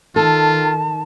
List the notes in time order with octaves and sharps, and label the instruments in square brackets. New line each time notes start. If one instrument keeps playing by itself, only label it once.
[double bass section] D#3 [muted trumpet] F4 [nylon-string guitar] A4 [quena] A5